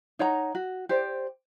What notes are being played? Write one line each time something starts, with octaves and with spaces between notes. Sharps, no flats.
D#4 C#5 F#5 A#5
F#4
G4 C5 D5